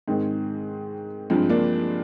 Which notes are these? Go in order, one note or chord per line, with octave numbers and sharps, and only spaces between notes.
G#2 D#3 G#3 C4
G2 F3 G#3 C4
A#3 D4